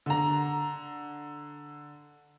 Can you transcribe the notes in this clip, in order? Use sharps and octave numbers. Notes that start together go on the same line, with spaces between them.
D3 A#5